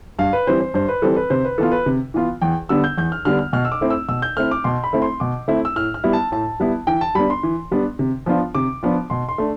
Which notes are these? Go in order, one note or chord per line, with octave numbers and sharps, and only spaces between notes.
G2 F5
B4
E3 G3 C4 C5
C5
G2 C5
B4
E3 G3 C4 A4
B4
C3 C5
B4
E3 B3 F4 A4
B4
C3
E3 B3 F4
E2 G5
D3 G3 B3 D4 E6
G6
E2 G6
F6
D3 G3 B3 D4 F6
F6
B2 F6
E6
D6
A3 C4 E4
E6
B2 E6
G6
A3 C4 E4 F6
D6
B2 C6
B5
A3 C4 E4
C6
B2 D6
A3 C4 E4
E6
A2 F6
F6
G3 B3 E4
A5
A2 A5
G3 B3 E4
E3 G5
A5
G3 B3 D4 B5
C6
E3
G3 B3 D4
C3
F3 B3 D4 F4
C3 D6
F3 B3 D4 F4
B2 C6
C6
A3 D4